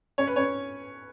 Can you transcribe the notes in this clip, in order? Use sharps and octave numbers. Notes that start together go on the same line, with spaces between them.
C#4 C#5
B4
C#4 C#5